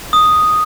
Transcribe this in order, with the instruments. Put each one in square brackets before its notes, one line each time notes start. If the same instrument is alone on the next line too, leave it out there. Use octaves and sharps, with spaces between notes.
[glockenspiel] D#6